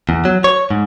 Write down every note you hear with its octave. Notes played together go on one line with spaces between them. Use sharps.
E2
F#3
C#5
G#2